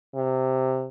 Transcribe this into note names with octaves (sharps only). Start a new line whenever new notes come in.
C3